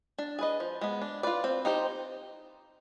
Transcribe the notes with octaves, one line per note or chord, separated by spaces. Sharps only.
D4
G#4 B4 D#5
F3
G#3 B3
D4
F4 B4 D5
C4
D#4 G4 C5